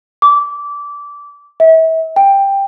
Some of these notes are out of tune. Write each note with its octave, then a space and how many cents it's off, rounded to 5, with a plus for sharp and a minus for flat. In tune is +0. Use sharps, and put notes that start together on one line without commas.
D6 -20
E5 -35
G5 +10